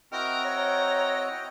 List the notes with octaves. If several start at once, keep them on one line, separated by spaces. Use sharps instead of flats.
C4 E4 F#4 A#4 D#5 G5
C#5 A#5